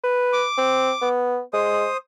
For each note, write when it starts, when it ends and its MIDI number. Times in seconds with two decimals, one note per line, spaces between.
0.04 0.44 71
0.33 1.09 86
0.58 0.91 60
1.01 1.40 59
1.53 1.86 56
1.53 1.97 72
1.53 1.97 87